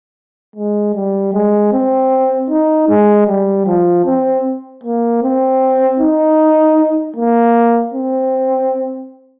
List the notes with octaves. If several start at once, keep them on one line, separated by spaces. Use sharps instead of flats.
G#3
G3
G#3
C4
D#4
G#3
G3
F3
C4
A#3
C4
D#4
A#3
C4